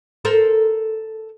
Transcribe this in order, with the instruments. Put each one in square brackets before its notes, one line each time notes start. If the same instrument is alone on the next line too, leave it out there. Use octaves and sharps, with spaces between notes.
[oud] A4 A#4 C5